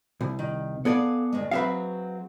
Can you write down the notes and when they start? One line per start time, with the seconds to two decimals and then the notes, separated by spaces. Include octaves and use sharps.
0.21 C2
0.39 D#3
0.85 B3 G#4 A4 D5 F5
1.33 D2 G2 G#3
1.51 F#3 C4 G#4 B4 E5 F5